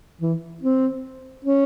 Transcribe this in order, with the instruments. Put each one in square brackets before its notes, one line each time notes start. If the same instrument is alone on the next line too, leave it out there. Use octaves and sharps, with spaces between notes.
[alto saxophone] E3
C4
C#4